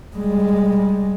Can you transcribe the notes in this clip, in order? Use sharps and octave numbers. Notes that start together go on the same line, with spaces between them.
G3 G#3